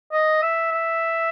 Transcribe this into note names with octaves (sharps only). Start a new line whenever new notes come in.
D#5
E5
E5